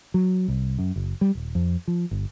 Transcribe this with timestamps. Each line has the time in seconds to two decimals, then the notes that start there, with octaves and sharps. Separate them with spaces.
0.14 F#3
0.48 C2
0.79 F#2
0.96 F#1
1.21 G3
1.35 D#1
1.55 F2
1.88 F3
2.11 G1